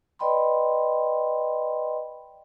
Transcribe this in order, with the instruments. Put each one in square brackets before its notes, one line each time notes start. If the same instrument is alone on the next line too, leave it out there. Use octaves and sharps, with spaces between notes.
[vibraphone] B4 D5 D#5 G5 B5 C6